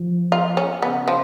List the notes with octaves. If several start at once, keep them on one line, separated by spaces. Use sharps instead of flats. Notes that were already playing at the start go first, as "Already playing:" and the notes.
Already playing: F3
F4
C#4
C#3 B3
F3